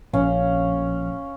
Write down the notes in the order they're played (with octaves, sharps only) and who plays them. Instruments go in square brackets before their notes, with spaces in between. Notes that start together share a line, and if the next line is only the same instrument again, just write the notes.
[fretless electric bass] A#1 [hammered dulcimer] C#4 F5